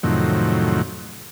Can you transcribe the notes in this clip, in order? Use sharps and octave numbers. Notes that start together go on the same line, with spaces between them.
F2 A2 C3 D#3 F#3